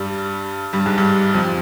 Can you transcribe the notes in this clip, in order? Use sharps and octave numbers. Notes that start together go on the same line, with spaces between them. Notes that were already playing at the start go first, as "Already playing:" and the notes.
Already playing: G2 G3
G2 G3
G#2 G#3
G2 G3
F2 F3